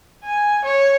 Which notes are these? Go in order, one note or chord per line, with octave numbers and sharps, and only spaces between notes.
G#5
C#5